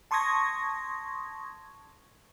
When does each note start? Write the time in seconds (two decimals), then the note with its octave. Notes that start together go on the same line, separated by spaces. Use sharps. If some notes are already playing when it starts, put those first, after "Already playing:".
0.11 A5 C6 C#6 D#6 G#6 A#6